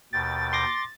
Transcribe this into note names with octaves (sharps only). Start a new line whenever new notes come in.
D#2 B2 G5 A6
C6 D6 A#6